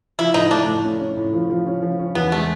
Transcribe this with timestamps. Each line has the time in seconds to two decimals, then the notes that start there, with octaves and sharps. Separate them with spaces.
0.19 F3 E4
0.34 A2 D#4
0.51 A3 D4
0.68 A2
0.84 C#4
1.00 C#4
1.17 A2
1.33 F3
1.50 F3
1.67 C#4
1.83 F3
1.99 C#4
2.15 E2 B3
2.32 G#3 A3